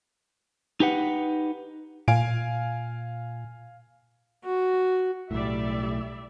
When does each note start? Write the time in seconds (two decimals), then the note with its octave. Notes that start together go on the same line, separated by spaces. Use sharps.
0.80 D#4 G4 B4 F#5
2.08 A#2 F5 G#5 D7
4.44 F#4
5.31 B1 A2 G3 D5 E5